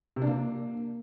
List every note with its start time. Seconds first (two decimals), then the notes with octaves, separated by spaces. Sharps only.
0.16 C3
0.22 D4
0.27 A#3